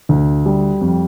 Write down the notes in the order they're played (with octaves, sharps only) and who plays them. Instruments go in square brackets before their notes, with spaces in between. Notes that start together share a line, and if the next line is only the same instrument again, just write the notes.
[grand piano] D2
G3
F2